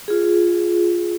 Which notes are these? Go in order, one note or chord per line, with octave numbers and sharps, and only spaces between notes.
F4 G#4